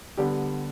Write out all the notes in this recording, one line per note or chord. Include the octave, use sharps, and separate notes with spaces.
D3 G3 B3 G4